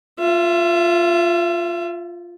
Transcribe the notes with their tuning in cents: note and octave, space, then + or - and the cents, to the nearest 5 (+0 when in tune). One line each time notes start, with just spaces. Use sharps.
F4 +0 E5 +35